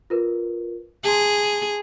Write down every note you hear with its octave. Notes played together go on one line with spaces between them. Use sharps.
F4 A#4 B4
G#4 A5 C6